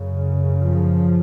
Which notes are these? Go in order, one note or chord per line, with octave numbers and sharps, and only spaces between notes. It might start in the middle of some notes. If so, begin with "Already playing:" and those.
Already playing: F#2 C#3
F3